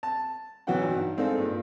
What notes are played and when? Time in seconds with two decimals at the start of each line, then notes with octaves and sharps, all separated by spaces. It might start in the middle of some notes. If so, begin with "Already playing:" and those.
0.03 A5
0.67 B2 E3 F#3 F#4 F#5 G5
0.83 G2 D#4
1.17 G#3 C4 D4 D#4 A4 F5
1.37 G2 A#2